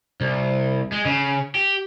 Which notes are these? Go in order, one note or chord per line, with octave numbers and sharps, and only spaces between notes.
C2
G#3
C#3
G4